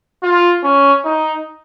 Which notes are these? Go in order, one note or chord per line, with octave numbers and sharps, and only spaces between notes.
F4
C#4
D#4